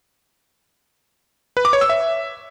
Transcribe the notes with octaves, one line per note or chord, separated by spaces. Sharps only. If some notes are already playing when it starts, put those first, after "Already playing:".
B4
D6
C#5
E6
E5